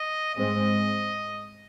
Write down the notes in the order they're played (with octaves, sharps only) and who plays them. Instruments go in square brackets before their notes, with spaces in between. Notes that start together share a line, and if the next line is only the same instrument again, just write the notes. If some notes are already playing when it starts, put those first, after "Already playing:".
Already playing: [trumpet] D#5
[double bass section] G#2 G#3 C4 [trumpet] D#5